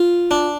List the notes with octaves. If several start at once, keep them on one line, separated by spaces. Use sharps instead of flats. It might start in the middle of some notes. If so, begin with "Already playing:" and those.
Already playing: F4
D4